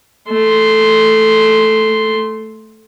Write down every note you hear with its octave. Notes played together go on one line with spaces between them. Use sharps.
A3 C6